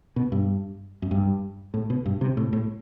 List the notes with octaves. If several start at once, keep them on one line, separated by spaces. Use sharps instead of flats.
B2
G2
F#2
G2
A2
B2
G2
C3
A2
A2